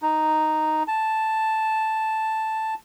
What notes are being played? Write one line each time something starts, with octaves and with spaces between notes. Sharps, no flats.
D#4
A5